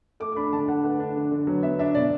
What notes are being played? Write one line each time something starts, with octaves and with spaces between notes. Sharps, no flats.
A3 D6
D6
D4 B5
D3 A5
D3 F#5
A3 B4
D4
D3
D3
F#3 B4
B3 E5
D4 E5
B2 D5